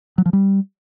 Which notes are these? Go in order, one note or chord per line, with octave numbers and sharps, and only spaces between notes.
F#3
F3
G3